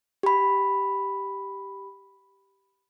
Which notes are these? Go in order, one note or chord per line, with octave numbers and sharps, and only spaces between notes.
G4 B5